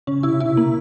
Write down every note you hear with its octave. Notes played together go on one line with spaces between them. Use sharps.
C#3 C#4
C3 E4
B2 E4
A#3